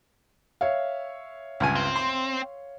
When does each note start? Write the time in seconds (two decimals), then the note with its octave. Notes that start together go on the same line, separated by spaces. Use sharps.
0.61 C#5 E5 F5
1.60 C#2 G2 G#5
1.75 C4
1.96 C6